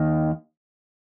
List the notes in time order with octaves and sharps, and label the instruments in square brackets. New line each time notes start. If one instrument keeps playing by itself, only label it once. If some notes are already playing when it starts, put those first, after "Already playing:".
Already playing: [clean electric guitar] D#2 D#3